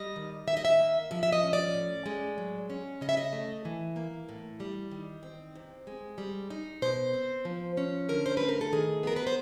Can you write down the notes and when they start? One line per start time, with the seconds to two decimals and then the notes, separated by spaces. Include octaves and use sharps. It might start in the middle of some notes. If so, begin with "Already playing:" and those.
Already playing: G3 D#5
0.16 D#3
0.47 D#3 E5
0.57 D#5
0.65 E5
0.79 A#3
1.11 F3 E5
1.23 E5
1.32 D#5
1.43 C#4
1.53 D5
1.74 A2
2.06 G#3
2.38 F#3
2.70 C#4
3.01 C#3 D#5
3.09 E5
3.17 D#5
3.33 A3
3.65 E3
3.96 A#3
4.29 A2
4.60 G3
4.91 D#3
5.23 C4
5.55 C3
5.87 G#3
6.18 G3
6.50 D#4
6.82 B2 C5
7.14 C4
7.45 F3
7.77 C#4
8.09 D3 A#4
8.26 C5
8.37 A3 B4
8.49 A#4
8.61 A4
8.73 D#3 G#4
9.03 B3 A#4
9.16 B4
9.27 C5